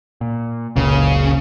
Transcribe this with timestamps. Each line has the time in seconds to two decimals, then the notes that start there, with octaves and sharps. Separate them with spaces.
0.21 A#2
0.76 F#1 C#2 A#2 C#3